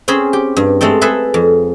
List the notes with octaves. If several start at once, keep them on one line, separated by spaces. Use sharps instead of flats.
C4 C#4 G#4 C5 B5
G4
G2
G#3 A3 C4 A4
G#4 A4 B4 E5
F2